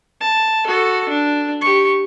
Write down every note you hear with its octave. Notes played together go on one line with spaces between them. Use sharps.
A5
F#4 A4
D4
G4 C#6